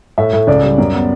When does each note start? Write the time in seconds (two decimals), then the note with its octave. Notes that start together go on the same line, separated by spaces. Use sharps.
0.18 A2 E5
0.33 A2
0.47 C#2 D5
0.63 G3
0.78 F#2
0.93 B3